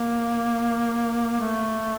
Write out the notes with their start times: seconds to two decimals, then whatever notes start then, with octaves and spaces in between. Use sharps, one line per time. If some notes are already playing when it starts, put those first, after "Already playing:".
Already playing: A#3
1.41 A3